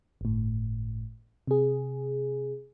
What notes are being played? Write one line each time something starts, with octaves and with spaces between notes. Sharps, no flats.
G1 A2
C3 G#4